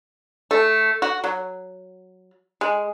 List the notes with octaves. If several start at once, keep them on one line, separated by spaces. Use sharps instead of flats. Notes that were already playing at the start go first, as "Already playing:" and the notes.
A3
F#4
F#3
G#3